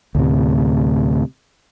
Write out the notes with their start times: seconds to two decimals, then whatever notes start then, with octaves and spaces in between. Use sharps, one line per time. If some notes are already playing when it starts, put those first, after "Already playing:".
0.15 D2 A2 C3